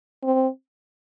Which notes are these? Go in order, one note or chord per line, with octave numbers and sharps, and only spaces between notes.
C4